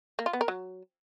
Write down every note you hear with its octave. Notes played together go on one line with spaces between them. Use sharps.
A#3
F4
B3
A#4
F#3